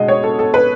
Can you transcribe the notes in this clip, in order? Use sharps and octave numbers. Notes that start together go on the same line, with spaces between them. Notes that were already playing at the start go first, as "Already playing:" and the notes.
Already playing: B2 G#3 D#5
C#5
A4
A4
B4